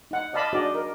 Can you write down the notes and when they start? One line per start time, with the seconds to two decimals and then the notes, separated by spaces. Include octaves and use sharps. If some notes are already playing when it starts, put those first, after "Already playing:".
0.11 D#4 F#5
0.33 D5 D#5 F5 A5 B5
0.53 D4 D#4 F#4 G#4 D5 D#5
0.75 A#4